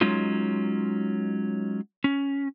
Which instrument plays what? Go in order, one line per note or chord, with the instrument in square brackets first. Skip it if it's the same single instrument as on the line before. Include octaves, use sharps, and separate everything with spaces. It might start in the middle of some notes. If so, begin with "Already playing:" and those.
[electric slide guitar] F#3 G#3 C#4 D#4 F4
C#4